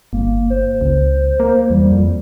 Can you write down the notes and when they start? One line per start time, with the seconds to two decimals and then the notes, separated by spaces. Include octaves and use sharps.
0.13 G1 A#3
0.50 C5
0.81 C#2
1.40 A#3
1.70 E2 G3
1.91 F2